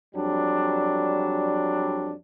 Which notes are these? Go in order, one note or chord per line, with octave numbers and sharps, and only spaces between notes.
F2 F#3 G3 D4